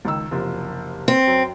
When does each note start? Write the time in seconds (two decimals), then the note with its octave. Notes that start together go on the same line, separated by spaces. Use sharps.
0.05 C#2 D#3 E6
0.31 F#1 C3 F3
1.08 C4
1.27 F#2